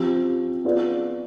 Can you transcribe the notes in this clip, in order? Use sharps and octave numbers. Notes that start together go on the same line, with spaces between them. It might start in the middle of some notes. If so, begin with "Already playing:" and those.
Already playing: F3 C4 G4
B3 F4 G#4 D5